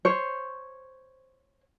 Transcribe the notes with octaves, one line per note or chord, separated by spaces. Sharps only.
C5 C#5